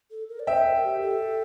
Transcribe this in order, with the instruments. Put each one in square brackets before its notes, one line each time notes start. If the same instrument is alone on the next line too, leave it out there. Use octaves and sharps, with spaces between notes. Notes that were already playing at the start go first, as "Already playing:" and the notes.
[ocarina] A4
A#4
D5
[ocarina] C5 [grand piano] E5 G5
[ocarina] A#4
G4
A4